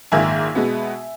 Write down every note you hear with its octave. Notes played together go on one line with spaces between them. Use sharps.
A#1 G#2 D#3 A#3 E5 G#5
B2 G#3 B3